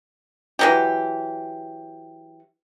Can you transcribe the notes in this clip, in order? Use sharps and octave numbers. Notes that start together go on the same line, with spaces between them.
E3 F#3 G4